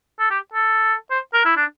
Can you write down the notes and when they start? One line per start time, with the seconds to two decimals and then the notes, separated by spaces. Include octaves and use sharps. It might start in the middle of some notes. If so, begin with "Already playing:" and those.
0.19 A4
0.30 G4
0.54 A4
1.11 C5
1.34 A#4
1.45 E4
1.57 D4